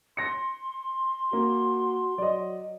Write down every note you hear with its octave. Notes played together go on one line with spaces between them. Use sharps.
C6 A#6 C#7
A#3 F#4
F#3 D5 D#5